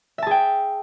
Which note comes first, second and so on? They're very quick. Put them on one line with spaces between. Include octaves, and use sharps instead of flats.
E5 A5 G#4 G5